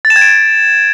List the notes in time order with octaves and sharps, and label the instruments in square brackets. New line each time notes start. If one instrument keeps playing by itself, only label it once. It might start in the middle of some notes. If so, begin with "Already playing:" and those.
[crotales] A6
E7
G#6
D7